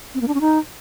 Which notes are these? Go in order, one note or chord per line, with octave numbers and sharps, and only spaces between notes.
C4
A#3
D4
C#4
D#4